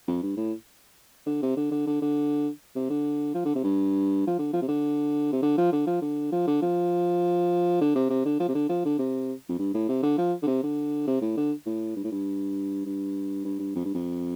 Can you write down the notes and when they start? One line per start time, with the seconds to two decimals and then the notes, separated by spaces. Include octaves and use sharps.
0.08 F2
0.23 G2
0.37 A2
1.27 D3
1.42 C3
1.57 D3
1.71 D3
1.87 D3
2.02 D3
2.76 C3
2.90 D3
3.35 F3
3.45 D3
3.55 C3
3.64 G2
4.27 F3
4.39 D3
4.53 F3
4.62 C3
4.68 D3
5.33 C3
5.42 D3
5.58 F3
5.73 D3
5.87 F3
6.02 D3
6.32 F3
6.47 D3
6.62 F3
7.81 D3
7.95 C3
8.10 C3
8.26 D3
8.40 F3
8.49 C3
8.55 D3
8.69 F3
8.85 D3
8.99 C3
9.49 F2
9.59 G2
9.74 A2
9.89 C3
10.03 D3
10.18 F3
10.43 D3
10.47 C3
10.63 D3
11.08 C3
11.22 A2
11.37 D3
11.66 A2
11.96 G2
12.04 A2
12.12 G2
12.86 G2
13.45 G2
13.59 G2
13.75 F2
13.85 G2
13.95 F2